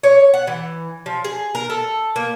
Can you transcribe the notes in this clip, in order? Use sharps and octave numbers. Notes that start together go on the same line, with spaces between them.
C#5
F#5
E3
F3
G#4
A#4
A4
A#3